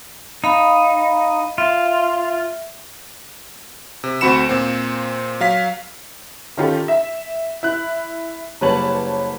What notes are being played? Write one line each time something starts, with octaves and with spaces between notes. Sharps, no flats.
D#4 F5 B5
F4 E5
C3
D2 C4 F#4 B5 C#7 E7
A#2 C4
F#3 F5 B6
D#3 C#4 F4 G4 A4
E5
E4 F#6
F#1 G3 B4 C#5 A5 F#7